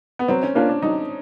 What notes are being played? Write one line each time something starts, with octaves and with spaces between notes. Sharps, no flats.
B3
F#3 C4
C#4
A#3 C#4 D4 F4
D4
F#3 D#4